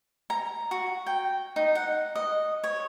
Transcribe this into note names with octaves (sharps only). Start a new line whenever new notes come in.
A#5
F#4
G5
D#4
F#5
D#5
C#5